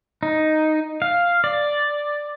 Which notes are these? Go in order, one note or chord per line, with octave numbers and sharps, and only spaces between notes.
D#4
F5
D5